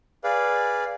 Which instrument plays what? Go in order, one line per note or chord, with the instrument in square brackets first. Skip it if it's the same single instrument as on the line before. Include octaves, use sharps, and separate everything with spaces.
[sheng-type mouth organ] G#4 B4 D5 F5